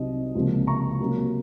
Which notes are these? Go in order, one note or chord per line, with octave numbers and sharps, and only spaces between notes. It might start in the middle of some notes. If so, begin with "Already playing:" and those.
Already playing: C2 C3 F#3 C4 D#4 D#5
C#2 C3 F3 A#3
A#5 C#6
C3 F#3 A#3 C#4